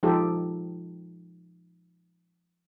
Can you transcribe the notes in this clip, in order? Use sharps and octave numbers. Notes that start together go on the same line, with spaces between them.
F3 G#3 D#4 F4 G4 A4